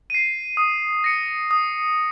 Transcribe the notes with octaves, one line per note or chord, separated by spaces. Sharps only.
C7 D#7
D#6
A#6 C#7
D#6